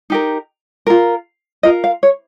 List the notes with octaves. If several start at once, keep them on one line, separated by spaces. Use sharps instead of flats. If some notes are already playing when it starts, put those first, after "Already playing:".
D#4 G4 A#4
F4 A#4
F4 A#4 D#5
F5
C#5